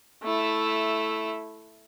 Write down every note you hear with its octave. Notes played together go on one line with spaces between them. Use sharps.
A3 E4